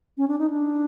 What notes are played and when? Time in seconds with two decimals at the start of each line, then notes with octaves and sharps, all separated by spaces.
0.17 C#4
0.28 D4
0.39 D#4
0.50 D4